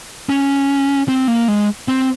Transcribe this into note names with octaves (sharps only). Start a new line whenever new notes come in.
C#4
C4
A#3
G#3
C4